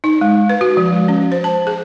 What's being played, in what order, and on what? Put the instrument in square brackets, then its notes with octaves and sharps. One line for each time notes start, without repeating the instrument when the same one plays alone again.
[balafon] D#4
G#3
B4
F#4
F3
G#3
C#4
C5
A5
G#4